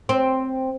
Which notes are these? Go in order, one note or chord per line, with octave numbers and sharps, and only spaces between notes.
C4